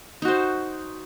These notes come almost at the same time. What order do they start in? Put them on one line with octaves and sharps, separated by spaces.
D#4 F#4 C5